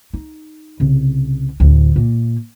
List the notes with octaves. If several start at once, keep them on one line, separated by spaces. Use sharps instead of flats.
D#4
C2 C#3
D2 A2
A#2 A#3